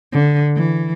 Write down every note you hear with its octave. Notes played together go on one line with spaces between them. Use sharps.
D3
E3